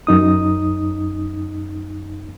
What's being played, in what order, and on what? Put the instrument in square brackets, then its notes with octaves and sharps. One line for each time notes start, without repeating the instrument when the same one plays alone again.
[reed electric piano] F#2 D#4 D#6